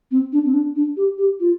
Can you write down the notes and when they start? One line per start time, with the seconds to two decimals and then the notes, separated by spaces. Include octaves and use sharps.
0.11 C4
0.33 D4
0.45 C4
0.54 D4
0.76 D4
0.97 G4
1.18 G4
1.40 F4